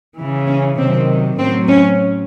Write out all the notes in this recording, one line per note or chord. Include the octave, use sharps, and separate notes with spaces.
C#3 E3
C#4
C3 D#3 F#3 C4
A2 F#3 C4
C#4